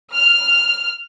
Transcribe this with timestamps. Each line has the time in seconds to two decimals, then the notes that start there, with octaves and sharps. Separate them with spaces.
0.14 F6